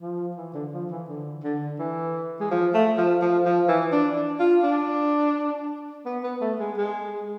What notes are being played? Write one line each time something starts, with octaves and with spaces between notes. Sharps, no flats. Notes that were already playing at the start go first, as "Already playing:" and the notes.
F3
E3
D3
F3
E3
D3
D3
E3
G#3
F3
A3
F3
F3
F3
E3
D4
D4
F4
D4
B3
B3
A3
G#3
G#3